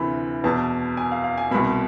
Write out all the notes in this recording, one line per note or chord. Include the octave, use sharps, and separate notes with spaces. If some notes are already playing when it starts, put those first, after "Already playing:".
Already playing: D2 C3 E3 B5
E2 B2 A5
G#5
F5
F5
G#5
C2 B2 B5